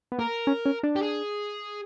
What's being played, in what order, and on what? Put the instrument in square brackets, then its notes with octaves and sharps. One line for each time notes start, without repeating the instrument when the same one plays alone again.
[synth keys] B3
[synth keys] A#3 [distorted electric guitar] A#4
[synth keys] C#4
C#4
D4
[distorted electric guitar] G4
G#4